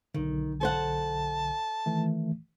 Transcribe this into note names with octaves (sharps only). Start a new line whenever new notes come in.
B1 D3 D#3
A4 C5 F#5 A5
D#3 E3 A3